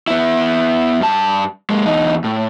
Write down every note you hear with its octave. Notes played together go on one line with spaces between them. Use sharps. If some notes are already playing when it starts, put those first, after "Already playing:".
B3 E4
G2 A5
G#3 A#3
E2 D#4
A2